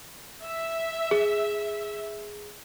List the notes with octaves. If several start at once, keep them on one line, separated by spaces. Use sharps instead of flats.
E5
G#4